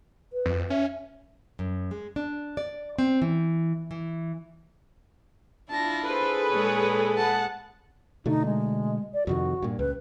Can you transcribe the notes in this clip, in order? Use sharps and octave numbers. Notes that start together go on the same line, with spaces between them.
B4
F2
C#4 E5
F#2
G#3
D4
D5
C4
E3
E3
D4 E4 F4 A5 A#6
G#4 A4 B4 C5
A#2 G#3 C#5
F#5 A5
B2 D3 A3 D#4
G#3
D5
F2 C3 D#3 F#4
G2 A#2
C#2 B4